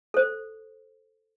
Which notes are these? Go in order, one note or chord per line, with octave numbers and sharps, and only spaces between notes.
A4 C5